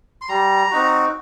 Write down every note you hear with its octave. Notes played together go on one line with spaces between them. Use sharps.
C6
G3 A#5
C4 D#4 F#4